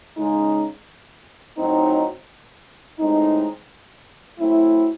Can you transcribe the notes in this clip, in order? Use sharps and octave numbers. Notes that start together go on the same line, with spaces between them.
C#3 G#3 D#4
A2 F#3 C4 D#4
A2 G#3 C4 D#4
F#3 A3 C4 E4